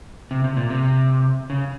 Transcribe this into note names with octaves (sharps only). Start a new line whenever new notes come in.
C3
C3
A#2
C3
C#3